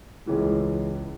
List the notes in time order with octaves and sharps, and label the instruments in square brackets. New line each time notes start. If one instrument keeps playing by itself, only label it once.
[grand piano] C#2 C#3 E3 G#3